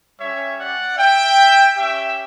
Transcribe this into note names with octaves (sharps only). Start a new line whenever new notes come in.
G3 C#4 G4 C#5 E5
D5 F#5
E5 G5
C#4 G4 E5 G5